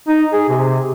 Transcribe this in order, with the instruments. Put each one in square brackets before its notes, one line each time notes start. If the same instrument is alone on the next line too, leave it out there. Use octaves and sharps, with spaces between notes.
[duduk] D#4
G#4
C3